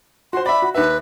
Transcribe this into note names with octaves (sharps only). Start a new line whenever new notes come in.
F#4 C5 C6
D5 E5 B5
F#4
D#2 B4 E5